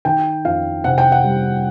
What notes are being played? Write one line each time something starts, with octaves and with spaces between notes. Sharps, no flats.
D#3 G5
F2 F5
C3 F#5
G5
F#5
G3